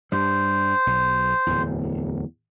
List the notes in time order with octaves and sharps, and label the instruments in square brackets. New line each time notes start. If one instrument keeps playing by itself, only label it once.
[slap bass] G2 G3 [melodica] C5
[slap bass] B1
D1 E2